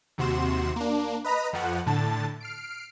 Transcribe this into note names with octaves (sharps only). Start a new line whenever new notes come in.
D#2 C3 F#4 C6 E7
A#3 D4
B4 D#5 A#5 B5
F2 F3 F#5
A2 D3 A5 A6
F6 C7 D7